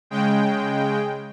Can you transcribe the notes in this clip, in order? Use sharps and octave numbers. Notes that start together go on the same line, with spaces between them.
C#3 G#3 G5